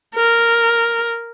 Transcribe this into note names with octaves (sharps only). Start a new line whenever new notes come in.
A#4